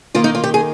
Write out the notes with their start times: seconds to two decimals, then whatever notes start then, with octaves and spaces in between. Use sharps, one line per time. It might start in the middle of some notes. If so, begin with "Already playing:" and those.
0.15 D#3 A#3 F4
0.24 D#4
0.35 F4
0.44 G4
0.54 G#4